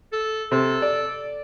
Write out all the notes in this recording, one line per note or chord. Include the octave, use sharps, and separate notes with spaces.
A4
C3 A4
D5